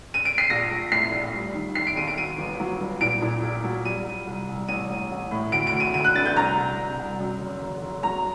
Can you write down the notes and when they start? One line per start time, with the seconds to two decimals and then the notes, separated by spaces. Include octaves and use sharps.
0.14 D#7
0.25 D7
0.38 C7
0.50 A#1 A#6
0.71 A#1
0.91 A2 C7
1.13 A#1
1.34 G3
1.54 D#3
1.75 D#3 C7
1.87 D7
1.97 D#2 D#7
2.08 D7
2.17 F#3 D#7
2.38 G1
2.60 F#3
2.80 G2
3.01 A#2 D7
3.22 A#2
3.43 A#1
3.64 F#3
3.85 G3 D#7
4.06 G3
4.27 C2
4.48 C2
4.68 A1 D#7
4.90 A1
5.11 A1
5.31 A2
5.52 D2 D7
5.67 D7
5.73 D2
5.80 D#7
5.94 D2 D#7
6.04 F#6
6.15 D3 A6
6.26 G6
6.36 C2 A#5
6.58 C2
6.78 C2
6.99 C2
7.20 F#2
7.41 F#1
7.62 F#1
7.82 F#1
8.03 F#3 A#5